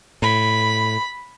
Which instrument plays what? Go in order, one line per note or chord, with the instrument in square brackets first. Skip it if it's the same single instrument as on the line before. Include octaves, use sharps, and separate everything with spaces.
[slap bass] A2 [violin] B5